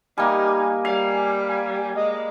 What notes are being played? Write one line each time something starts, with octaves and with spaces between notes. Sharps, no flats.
G3 A#3 D#4 G#5
G3 F5
G#5
G#3 D#5